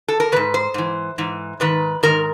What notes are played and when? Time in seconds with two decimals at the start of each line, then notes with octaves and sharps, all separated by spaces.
0.08 A4
0.20 A#4
0.32 G#2 D#3 B4
0.54 C5
0.74 G#2 E3
1.18 G#2 E3
1.60 G#2 D#3 B4
2.03 G#2 D#3 A#4